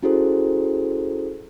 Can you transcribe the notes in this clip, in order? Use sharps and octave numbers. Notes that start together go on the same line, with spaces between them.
C#4 E4 F#4 G#4 A4 C5